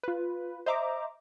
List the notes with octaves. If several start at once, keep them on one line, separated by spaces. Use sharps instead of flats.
F4 B4
C5 D#5 E5 A#5 D6